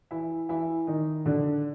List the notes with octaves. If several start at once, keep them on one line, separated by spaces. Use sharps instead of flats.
E3 E4
E3 E4
D#3 D#4
D3 D4